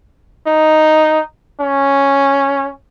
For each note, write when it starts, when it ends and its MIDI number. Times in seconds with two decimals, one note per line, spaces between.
0.47 1.21 63
1.61 2.70 61